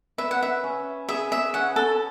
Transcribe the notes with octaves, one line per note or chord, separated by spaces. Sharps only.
B4 E5
F#5
E5
C#4
G#4 E5
E5
C#4 F#5
A4